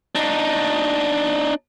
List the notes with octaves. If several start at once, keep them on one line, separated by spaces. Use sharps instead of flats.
D4 D#4